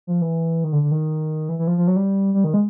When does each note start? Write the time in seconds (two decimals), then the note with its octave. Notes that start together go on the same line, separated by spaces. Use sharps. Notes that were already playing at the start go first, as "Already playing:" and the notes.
0.07 F3
0.21 E3
0.64 D#3
0.72 D3
0.83 D3
0.91 D#3
1.49 E3
1.59 E3
1.67 F3
1.78 F3
1.87 F#3
1.96 G3
2.34 G3
2.44 D#3
2.54 G#3